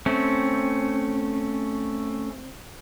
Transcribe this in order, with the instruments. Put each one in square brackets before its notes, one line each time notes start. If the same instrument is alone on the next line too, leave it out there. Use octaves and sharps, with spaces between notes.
[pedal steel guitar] A3 C#4 [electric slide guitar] C4